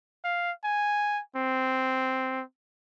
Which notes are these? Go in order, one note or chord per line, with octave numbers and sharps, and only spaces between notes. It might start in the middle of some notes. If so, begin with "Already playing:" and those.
F5
G#5
C4